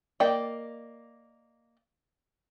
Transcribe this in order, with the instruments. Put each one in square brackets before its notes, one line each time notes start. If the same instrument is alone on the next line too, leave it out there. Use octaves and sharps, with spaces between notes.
[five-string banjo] A#3 D5 D#5 G5